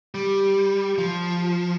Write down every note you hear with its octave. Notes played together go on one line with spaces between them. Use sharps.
G3
F3